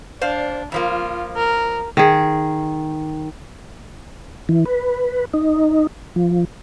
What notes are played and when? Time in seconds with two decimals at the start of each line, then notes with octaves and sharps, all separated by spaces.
0.21 D4 C5 D5 F5
0.72 F2 F3 A#3 F4
1.36 A#4
1.97 D#3 G#4
4.49 E3
4.66 B4
5.34 D#4
6.16 F3